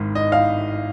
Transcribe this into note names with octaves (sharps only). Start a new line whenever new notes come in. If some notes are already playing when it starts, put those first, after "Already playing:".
Already playing: G#1 G#2 D#3
D#5
F5